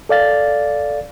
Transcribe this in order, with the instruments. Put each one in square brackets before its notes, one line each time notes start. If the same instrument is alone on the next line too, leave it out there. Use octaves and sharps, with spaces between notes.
[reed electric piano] A4 D5 F5 A6